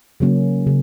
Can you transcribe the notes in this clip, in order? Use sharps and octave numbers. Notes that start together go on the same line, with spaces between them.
C#3 F#3 A#3 C#4
C#3